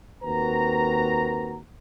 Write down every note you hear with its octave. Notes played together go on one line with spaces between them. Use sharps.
D#2 C4 F#4 A#4 B4 A#5